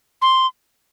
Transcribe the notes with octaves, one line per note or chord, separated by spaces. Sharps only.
C6